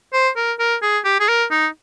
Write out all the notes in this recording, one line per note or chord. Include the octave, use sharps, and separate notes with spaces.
C5
A#4
A#4
G#4
G4
G#4
A#4
D#4